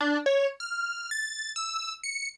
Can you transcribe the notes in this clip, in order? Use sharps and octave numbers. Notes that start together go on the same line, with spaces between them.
D4
C#5
F6
A6
E6
C#7